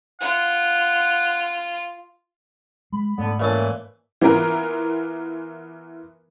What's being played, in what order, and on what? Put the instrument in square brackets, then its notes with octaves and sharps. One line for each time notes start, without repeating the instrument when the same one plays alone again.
[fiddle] F4 [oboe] F#5
[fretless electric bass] G#3 [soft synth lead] B5
[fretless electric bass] G#2 A3 [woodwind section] D3 B3
[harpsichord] A#2 C#4 A4 [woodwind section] E3
[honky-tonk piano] E3 B3 F4 A#4